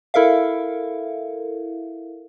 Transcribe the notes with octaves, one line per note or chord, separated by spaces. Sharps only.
E4 A4 A#4 E5 F5